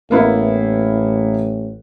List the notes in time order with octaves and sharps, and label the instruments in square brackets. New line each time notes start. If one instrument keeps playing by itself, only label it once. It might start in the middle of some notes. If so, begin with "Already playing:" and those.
[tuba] A1 [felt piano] A#3 B3 E4